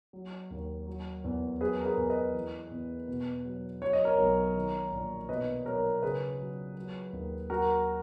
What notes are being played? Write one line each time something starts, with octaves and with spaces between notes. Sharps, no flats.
F#3
D#2
F#3
E2
F#3 G#4 B4
A#4
G#4 B4
E2
B4 D#5
E3
E2
B2
F#3
F#3 C#5
D#5
A#4 C#5
B1
D#3
A#1
B2 B4 D#5
F#3 A#4 C#5
C#3 G#4 B4
F#3
F#3
D#2
F#3 F#4 A#4